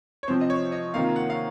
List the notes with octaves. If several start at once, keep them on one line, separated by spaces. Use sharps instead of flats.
C#5
C3 F3 C4 C5
D#5
C#5
D#5
C3 D#3 A#3 F4 F5
F#5
F5